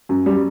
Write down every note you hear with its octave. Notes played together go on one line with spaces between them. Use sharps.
F#2
G3